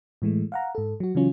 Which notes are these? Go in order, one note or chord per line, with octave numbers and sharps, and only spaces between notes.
A2 E3 G#3 A3
F5 F#5 A#5
G#2 A4
F#3 F#4
C#3 E3 F#3 C#4 F4